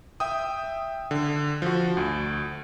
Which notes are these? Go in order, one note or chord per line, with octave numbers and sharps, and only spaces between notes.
E5 G5 D#6
D3
F3 F#4
D2